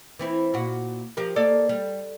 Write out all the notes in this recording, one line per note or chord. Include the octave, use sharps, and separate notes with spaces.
E3 C4 E4
A#2 F#4
F3 G4 A#4
A#3 A4 D5
G3